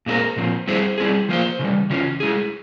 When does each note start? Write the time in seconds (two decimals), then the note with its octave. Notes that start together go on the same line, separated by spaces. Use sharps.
0.06 A#2 G#3 C4 E4 A#4
0.36 A#2 F3 C4
0.67 G3 C4 E4 G#4 C5
0.98 G3 C4 E4 G#4
1.29 F3 A#3 F4 C5
1.59 C#3 E3 G3
1.90 C#3 E3 C#4 F4
2.20 G#3 E4 G#4